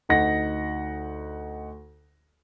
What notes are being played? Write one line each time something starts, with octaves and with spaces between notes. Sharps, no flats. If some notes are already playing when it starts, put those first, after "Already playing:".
D2 D#4 F#5 A#6